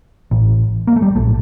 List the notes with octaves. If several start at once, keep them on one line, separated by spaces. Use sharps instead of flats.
A1 A2
A#3
A3
G3
A#1 A2 A3